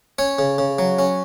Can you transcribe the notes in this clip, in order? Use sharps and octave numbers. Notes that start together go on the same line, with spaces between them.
C#4 C#5
C#3
C#3
F#3
C#4